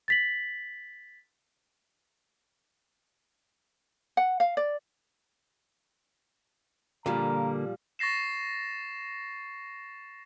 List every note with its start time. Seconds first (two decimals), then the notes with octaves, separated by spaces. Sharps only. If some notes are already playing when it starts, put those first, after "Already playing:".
0.08 A6 B6 F#7
4.17 F#5
4.40 F5
4.57 D5
7.06 A#2 D3 F3 G3 A#3 A#5
7.99 C#6 A6 A#6 C7 E7